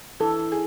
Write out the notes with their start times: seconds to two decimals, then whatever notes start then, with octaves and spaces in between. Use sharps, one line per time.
0.20 E3 A4
0.52 G#4